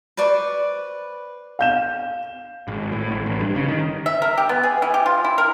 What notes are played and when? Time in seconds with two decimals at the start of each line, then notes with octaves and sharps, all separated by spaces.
0.17 B4 C5 D5 C#6
1.59 F5 G6 E7
2.68 G#1
2.92 A2
3.11 G#1
3.26 A1
3.40 G2
3.56 C#3
3.68 D#3
4.06 E5
4.22 A#4
4.38 G4
4.49 B3
4.63 G#4
4.82 E3
4.94 G4
5.06 F4
5.24 E4
5.38 A#4